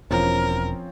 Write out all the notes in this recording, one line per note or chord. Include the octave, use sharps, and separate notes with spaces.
E1 F3 C4 C#4 A#4